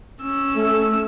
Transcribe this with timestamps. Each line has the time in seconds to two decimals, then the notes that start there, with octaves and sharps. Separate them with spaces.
0.22 C#4 E6
0.55 A3